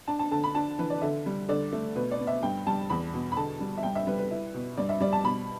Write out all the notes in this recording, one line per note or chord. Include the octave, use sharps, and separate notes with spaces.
D4 A5
A5
D3 A5
B5
D4 A5
E3 B4
D5
D3 E5
G3
D3 D5
A3
B2 B4
D5
B3
E5
G2 G5
G3 A5
E2 B5
B2
B5
D3 A5
G3
E5
G2 G5
E5
G3 B4
B4
E4
B2
G2 D5
E5
G3 D5
A5
B2 B5